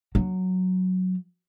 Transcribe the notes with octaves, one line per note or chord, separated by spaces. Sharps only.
F#3